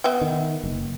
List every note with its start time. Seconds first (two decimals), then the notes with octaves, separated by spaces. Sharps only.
0.04 B3 E5 G5
0.21 D#3
0.64 F#1